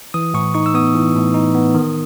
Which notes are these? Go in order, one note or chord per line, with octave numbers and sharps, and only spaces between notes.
E3 D#6
A2 C#6
D#4 C#6
E6
B3 D#6
E3
A2
D#4
B3
D#3